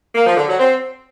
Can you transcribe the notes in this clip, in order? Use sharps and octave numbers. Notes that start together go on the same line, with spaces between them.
A#3
F3
D3
F#3
C4